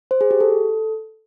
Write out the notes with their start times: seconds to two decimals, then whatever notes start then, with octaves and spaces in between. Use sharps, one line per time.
0.11 C5
0.21 G#4
0.31 G4
0.41 A4